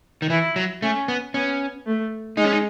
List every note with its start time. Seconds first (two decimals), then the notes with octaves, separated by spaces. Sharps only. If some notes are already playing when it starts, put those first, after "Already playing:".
0.22 D#3
0.30 E3 E4
0.56 F#3
0.82 A3 C#4
1.08 B3
1.34 B3 C#4
1.86 A3
2.37 G#3 D#4
2.45 C#4
2.52 D#4